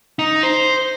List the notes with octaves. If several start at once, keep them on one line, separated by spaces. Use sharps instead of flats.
D#4
C5